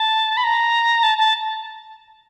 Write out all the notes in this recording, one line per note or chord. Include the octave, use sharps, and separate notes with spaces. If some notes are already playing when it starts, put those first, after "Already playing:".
Already playing: A5
B5
A#5
A5
A5